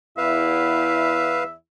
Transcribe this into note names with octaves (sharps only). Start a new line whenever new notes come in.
E2 E4 B4 E5 F5